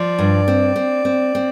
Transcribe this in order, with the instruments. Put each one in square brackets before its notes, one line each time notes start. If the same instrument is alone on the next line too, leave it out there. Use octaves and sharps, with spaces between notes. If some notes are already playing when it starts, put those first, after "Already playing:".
Already playing: [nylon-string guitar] F3 [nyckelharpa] D5
[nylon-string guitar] G2
C4
C4
C4
C4